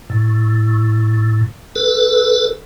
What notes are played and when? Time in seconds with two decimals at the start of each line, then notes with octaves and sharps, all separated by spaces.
0.10 A2
1.76 A4 B4